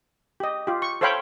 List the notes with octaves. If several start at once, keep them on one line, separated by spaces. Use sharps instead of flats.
G4 D#5
F4 G4
C#6
A4 C5 C#5 F5 G5 B5